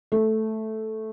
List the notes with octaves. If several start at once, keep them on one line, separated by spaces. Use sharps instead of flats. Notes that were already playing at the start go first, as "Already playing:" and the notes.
A3